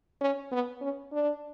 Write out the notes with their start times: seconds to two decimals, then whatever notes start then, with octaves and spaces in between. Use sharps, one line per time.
0.21 C#4
0.52 B3
0.82 C#4
1.12 D4